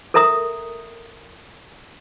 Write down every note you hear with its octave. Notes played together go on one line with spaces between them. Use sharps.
A4 A#4 E5 A#5 D#6